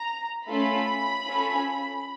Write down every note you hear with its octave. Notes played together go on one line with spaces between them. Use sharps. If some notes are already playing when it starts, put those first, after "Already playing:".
Already playing: A#5
A3 C#4 F4 A4 B5
C#4 F4 A4